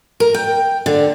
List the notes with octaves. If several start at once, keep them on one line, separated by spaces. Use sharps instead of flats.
A#4
G5
D3